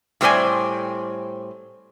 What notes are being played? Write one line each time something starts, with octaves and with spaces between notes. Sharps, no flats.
A2 G3 C4 C5 D5 G#5